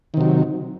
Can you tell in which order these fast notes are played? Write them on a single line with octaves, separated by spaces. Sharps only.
D#3 C3 F#3